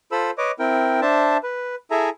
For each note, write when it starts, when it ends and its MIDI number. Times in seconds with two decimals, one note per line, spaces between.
0.12 0.31 65
0.12 0.31 69
0.12 0.31 72
0.12 0.31 83
0.12 0.31 88
0.38 0.51 71
0.38 0.51 73
0.38 0.51 75
0.38 0.51 86
0.59 1.00 60
0.59 1.00 64
0.59 1.00 70
0.59 1.00 79
1.01 1.37 62
1.01 1.37 72
1.01 1.37 76
1.01 1.37 81
1.43 1.75 71
1.91 2.10 64
1.91 2.10 68
1.91 2.10 69
1.91 2.10 76
1.91 2.10 80
1.91 2.10 82